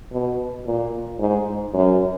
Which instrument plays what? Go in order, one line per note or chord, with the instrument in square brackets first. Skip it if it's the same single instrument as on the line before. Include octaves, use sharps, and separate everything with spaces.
[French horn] B2
A#2
G#2
F#2